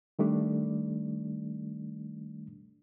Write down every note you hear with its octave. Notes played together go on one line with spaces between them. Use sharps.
D#3 G3 A3 D4